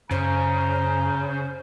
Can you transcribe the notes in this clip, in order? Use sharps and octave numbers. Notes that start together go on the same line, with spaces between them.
F#2 C#3 C5 A#5